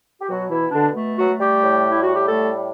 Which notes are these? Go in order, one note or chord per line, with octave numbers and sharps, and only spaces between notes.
G4
B2 F#3 F#4
E3 E4
B2
D3 D4
A3
F#3 F#4
A3
G3 G4
A2
G3 E4
F#4
G4
A2 A3 A4